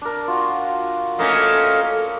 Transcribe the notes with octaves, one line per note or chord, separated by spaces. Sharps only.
D4 A#4
F4 F#4
A3 A#3 C#4 A#4 D#5 F5 A#5